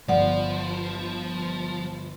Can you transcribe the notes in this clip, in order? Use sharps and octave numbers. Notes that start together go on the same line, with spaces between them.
G1 F3 D5 F#5